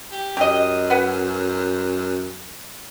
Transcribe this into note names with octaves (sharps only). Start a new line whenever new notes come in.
G4
F#2 G4 D#5
B4 F#5 G#5